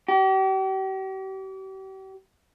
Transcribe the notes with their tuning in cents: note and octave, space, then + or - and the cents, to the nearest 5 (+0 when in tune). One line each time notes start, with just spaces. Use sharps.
G4 -40